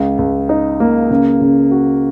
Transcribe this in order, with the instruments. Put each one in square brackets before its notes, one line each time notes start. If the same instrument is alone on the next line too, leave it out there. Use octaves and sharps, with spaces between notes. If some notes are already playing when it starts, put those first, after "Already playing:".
Already playing: [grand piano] C#2
C#2
D#4
A#3
C#3
C#3
F#4